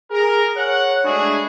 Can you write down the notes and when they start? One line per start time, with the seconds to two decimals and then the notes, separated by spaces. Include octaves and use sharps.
0.11 G#4 A#4
0.56 C#5 F#5
1.04 G#3 A3 D4 E4 F#4 G#4